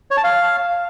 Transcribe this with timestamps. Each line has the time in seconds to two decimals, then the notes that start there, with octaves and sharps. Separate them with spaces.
0.11 C#5
0.17 A5
0.24 F5